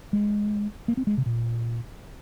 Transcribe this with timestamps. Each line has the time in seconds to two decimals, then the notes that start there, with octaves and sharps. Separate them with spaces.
0.13 G#3
0.88 A#3
0.97 C4
1.07 G#3
1.18 C3
1.26 A#2